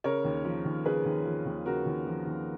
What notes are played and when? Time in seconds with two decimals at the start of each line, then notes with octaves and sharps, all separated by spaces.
0.04 C#3 A#4 C#5
0.24 D#2
0.44 F3
0.65 D#2
0.85 C#3 G#4 B4
1.05 D#2
1.25 F3
1.46 D#2
1.66 C#3 F#4 A#4
1.86 D#2
2.07 F3
2.26 D#2